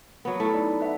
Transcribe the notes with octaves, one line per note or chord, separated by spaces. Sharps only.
F#3 B3
A3 E4
D#4 D5
B4 E5 F#5